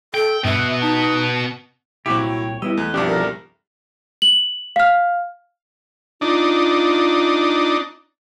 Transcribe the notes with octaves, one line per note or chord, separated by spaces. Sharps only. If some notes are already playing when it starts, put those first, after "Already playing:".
A4 G5
G2 B2 B3 E5
F#6
D#4 A5
C2 A#2 F#3 C4 E4 F#4 G4
C#5 G5
G3 B3 E4 D#5 E6
E2 A3 F#6
C2 G2 B2 F3 G3 D4 G4 E5
A4 A#4 E5
F#7
F5 F6
D4 D#4 F4